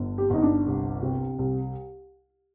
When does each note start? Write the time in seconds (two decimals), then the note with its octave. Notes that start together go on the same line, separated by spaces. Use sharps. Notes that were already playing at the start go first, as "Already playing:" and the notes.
Already playing: G1 D3
0.18 G4
0.30 G1 D#4
0.42 D4
0.67 C2
1.03 C3
1.39 C2